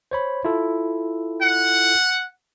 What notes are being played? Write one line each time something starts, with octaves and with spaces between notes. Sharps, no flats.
C5 C#5 B5
E4 F4 A4
F#5